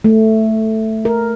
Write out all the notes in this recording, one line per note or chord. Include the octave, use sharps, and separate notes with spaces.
A3
A#4